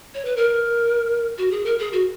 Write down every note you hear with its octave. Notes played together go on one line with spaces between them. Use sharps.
C#5
B4
A#4
F#4
G#4
A#4
G#4
F#4